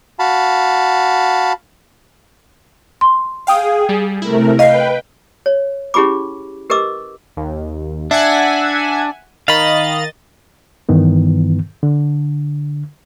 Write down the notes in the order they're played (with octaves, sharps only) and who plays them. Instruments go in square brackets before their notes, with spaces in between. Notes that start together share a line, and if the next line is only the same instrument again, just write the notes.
[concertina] F#4 F5 A5 B5
[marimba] C6
[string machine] G#4 [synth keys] F5 G5 D#6
[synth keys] G3
[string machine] C3 A3 A#4 [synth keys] E4
[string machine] B4 G5 [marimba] D#5 [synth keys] F5 C7
[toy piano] C#5
C#4 E4 G4 G#4 B5 D6
G4 A#4 B4 D#5 D6 E6
[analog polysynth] D#2
[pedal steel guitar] D4 [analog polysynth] E5 F#5 G#5
[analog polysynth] D#3 D#5 A6 [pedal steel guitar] F5 B5
[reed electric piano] G2 D#3 E3 B3
D3